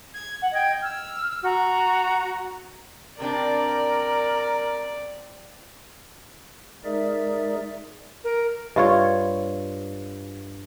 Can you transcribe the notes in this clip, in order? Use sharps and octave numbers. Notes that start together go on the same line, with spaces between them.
G#6
F#5
D#5 G5 G#6
E6 F6
F#4 A#5
C3 C4 D4 A#4 D5
G#3 D#4 G#4 A#4 D5 E5
A#4
G2 F4 C#5